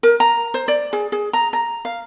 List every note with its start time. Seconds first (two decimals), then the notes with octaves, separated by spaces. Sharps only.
0.03 A#4
0.20 A#5
0.54 C5
0.68 D5
0.93 G#4
1.12 G#4
1.33 A#5
1.53 A#5
1.85 F5